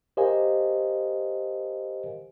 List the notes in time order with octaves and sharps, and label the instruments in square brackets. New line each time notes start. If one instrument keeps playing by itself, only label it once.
[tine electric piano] G4 A#4 C5 D#5 F5 G#5